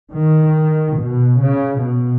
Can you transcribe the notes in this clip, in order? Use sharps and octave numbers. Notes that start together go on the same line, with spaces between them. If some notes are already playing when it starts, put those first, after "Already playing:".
D#3
B2
C#3
B2